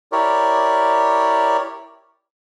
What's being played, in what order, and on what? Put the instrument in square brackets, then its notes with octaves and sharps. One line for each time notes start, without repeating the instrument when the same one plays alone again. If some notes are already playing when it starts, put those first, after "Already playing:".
[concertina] E4 G4 A#4 C#5 D5